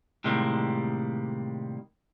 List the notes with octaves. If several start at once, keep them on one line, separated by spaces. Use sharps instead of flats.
A2 C3 D#3 G3 G#3 A#3